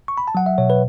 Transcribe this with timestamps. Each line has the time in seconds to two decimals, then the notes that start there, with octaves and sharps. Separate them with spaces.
0.08 C#6
0.18 B5
0.28 A5
0.35 F#3 F#5
0.46 E5
0.58 B2 C#5
0.70 B4